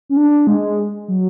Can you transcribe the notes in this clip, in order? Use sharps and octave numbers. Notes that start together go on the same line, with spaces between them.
C#4
D4
G#3
F#3